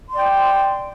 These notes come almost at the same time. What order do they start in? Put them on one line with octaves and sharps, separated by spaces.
C6 D5 G5